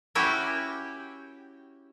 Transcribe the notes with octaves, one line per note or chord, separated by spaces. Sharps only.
C#4 E4 F#4 G4